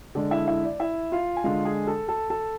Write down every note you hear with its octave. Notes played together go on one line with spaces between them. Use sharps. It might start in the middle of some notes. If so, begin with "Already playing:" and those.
D3 G#3 D5
E4 E5
E4 E5
D5
E4 E5
F4 F5
G#5
D3 G#3 F4 F5
G#4 G#5
A4 A5
A4 A5
A4 A5